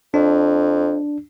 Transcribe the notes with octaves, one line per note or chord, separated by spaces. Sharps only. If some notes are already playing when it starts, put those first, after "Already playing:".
F2 D4